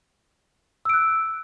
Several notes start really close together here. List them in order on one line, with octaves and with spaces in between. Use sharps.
E6 D7 F#6